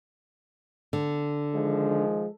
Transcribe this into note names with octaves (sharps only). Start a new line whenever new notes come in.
D3
D#3 F3 G#3